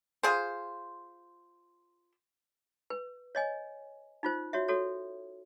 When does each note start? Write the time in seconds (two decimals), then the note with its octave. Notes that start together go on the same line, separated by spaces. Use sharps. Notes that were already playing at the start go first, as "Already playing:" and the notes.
0.23 F4 G#4 C5
2.90 B4
3.35 C#5 D#5 G#5
4.23 D#4 F4 C5
4.53 F#4 C#5 E5
4.68 F#4 A4 C#5